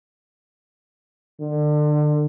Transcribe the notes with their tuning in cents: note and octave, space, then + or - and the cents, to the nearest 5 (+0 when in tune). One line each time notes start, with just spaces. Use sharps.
D3 +30